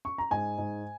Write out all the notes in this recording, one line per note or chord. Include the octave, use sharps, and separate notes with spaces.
C#6
A#5
G#2 G#5
G#2